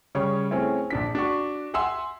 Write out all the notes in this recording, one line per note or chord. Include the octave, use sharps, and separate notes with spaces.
C#3 G3 C#5 C#6
A3 C4 C#4 E4 G#4
A#1 D4 B6
D4 F#4 C#6
E5 F#5 G#5 C6 E6